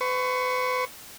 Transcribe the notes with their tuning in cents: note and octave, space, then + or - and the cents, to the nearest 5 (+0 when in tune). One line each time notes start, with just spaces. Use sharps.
B4 +40 C#6 +0